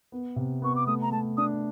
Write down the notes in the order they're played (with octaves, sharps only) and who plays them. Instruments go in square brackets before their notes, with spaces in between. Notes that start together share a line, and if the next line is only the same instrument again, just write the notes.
[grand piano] B3
C3
[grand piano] B3 [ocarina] C#6
[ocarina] D6
[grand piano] A3 [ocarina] D#6
[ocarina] A#5
[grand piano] A3 [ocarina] A5
[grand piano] D4 [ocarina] D#6